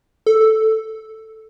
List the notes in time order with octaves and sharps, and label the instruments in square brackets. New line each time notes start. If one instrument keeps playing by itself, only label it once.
[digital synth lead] A4